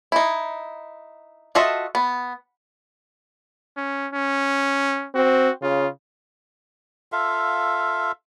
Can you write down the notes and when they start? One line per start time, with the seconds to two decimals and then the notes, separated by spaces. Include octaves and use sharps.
0.12 D#4 E4
1.55 F4 F#4 A4 D#5 E5
1.95 B3
3.77 C#4
4.13 C#4
5.15 C4 F#4
5.62 C#3 F4
7.12 F4 A4 E5 F5